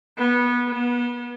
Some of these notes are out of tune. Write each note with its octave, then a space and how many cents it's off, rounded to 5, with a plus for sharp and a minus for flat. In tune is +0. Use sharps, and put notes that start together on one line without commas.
B3 -20
B3 -30